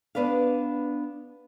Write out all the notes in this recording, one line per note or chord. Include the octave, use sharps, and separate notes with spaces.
B3 D4 B4 D5 F5